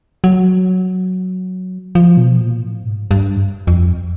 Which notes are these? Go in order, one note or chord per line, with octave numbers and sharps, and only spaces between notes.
F#3
F3
B2
A#2
A2
G#2
G2
F2